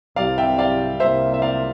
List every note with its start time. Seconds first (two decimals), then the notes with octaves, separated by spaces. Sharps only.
0.16 C2 C3 G3 D5 F5
0.38 E5 G5
0.58 D5 F5
1.00 C2 C3 G3 A#3 F4 C5 E5
1.34 E5
1.42 D5 F5